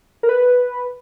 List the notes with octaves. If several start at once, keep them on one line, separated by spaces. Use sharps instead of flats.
A#4
B4